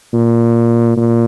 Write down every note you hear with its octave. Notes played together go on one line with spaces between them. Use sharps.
A#2
A#2